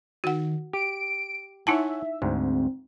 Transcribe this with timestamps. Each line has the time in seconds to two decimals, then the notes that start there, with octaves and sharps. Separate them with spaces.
0.24 D#3 F#4 F#5
0.73 G4 D7
1.67 D#4 E4 C#5 E5 F#5 G#5 A5
2.22 D2 G#2 C4